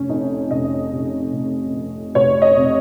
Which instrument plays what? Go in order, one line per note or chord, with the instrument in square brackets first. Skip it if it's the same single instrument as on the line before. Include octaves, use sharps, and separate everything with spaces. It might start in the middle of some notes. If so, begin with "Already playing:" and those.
Already playing: [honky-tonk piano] F1 C#4
F2 D#4
F1 D#5
C3
F1
F2
F1 C#5
D#5
C3